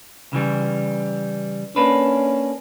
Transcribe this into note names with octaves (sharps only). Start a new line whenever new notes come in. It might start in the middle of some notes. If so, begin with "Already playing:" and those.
C#3 E3 G3
A#3 C#4 D4 B4